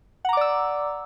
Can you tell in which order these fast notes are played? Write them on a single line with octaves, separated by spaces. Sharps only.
F#5 A#5 D6 D5 E6